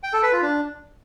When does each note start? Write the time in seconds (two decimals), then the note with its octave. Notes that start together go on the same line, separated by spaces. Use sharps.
0.03 G5
0.13 A4
0.23 B4
0.33 F4
0.42 D4